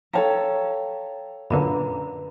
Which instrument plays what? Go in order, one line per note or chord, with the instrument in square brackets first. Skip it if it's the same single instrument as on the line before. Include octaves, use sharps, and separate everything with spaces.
[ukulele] A4 C#5 A5 [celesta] F5 G5 A#5
[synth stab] F#2 A#2 D3 [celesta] B4 A#5 B5